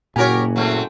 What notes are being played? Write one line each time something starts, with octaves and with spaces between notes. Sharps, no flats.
F#1 A#2 F#4 G4 A#4 C#5 G#5
F#3 A3 C4